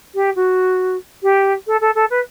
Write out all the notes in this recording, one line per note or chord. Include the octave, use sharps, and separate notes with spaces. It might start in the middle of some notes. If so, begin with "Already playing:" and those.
G4
F#4
G4
A4
A4
A4
B4